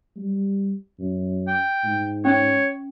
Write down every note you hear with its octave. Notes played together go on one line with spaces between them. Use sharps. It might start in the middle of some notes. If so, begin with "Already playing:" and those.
G3
F#2
G5
G#2
C#4 C#5